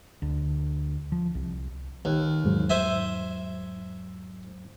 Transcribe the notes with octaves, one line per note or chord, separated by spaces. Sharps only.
D2
F3
C2
D#2
E2 G#2 F#3
C5 E5 G#5